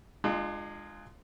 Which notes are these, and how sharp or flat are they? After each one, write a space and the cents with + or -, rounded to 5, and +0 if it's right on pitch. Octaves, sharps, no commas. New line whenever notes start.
G#3 +0 D4 +40 F4 +0